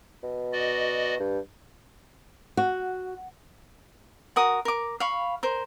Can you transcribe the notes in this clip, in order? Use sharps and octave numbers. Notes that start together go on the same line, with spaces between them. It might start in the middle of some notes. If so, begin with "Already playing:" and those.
B2
F#4 D5 D#5
G2
F#4
F#4 A#4 D#6
A#4 D6
F5 B5 C#6
A#4 C5